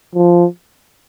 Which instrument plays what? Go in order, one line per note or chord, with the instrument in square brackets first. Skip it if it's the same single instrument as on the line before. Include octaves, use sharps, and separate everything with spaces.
[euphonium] F3